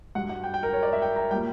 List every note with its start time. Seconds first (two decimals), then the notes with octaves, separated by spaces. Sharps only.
0.15 G2 F#3 F#5
0.29 F#5
0.44 G5
0.54 G5
0.63 A#4
0.73 C#5
0.83 D5
0.93 E5
1.02 G5
1.16 A#5
1.31 A#2 G3 G5